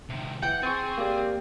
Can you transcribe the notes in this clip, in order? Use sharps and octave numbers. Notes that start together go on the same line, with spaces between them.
C3 D#3
E3 F#5 G5
C4 G#4 C#6 A6
A#3 G4 D5